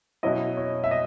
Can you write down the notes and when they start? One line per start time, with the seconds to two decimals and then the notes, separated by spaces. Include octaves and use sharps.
0.23 B2 F#3 C#4 E4 D#5
0.57 C#5
0.84 E5
0.91 D#5